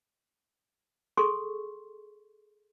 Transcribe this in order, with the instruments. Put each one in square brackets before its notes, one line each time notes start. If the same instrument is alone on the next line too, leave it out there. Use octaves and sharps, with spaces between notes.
[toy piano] G#4 A4 C6 C#6